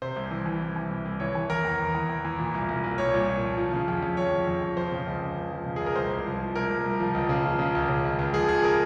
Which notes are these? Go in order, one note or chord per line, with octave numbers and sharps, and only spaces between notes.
C3 C5
C2
E3
E3
C2
E3
C2
C2
E3 C#5
E3
E3 A#4
E2
E2
E3
E2
E3
A#2
C2
C2
C2
C2 C#5
A#2
A#2
F3
F3
C#3
F2
F2
F2 C#5
F2
F2
F2
F3 C5
C#3
C#2
C#3
C#2
F3
C#3
C#2 G#4
A#4
C2 C5
C2
F3
C2
C2 A#4
C2
C2
F3
C#2
C#3
F3
C#3
C#2
C#3
C#2
C#2
F3 G#4
C#2 G#4
A#4